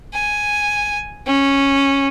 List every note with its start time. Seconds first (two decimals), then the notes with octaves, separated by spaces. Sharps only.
0.13 G#5
1.26 C#4